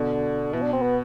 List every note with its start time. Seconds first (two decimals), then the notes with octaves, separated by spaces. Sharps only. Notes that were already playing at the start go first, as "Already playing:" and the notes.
Already playing: B2 D3
0.53 B2 E3
0.62 D4
0.73 C4
0.82 B3